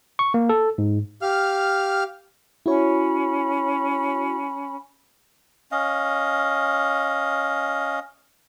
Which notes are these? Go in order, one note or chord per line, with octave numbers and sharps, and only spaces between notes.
C#6
A#3
A4
G#2
G4 F5 F6
C#4 E4 F#4 C#5 B5
C#4 D#5 F5